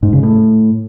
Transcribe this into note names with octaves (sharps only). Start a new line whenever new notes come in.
G#2
C#3
A2